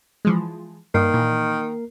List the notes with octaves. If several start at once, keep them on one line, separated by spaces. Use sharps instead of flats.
E3 F3 G#3
G2 D#3 A#3 A#4 C7
A#2 E3